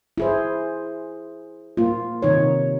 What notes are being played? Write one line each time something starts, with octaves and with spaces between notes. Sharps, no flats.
E4 G#4 C5
A#3 F4
C3 D#3 D#4 C#5